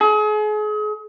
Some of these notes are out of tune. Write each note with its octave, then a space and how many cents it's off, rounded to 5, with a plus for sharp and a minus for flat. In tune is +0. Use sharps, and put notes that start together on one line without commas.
G#4 +35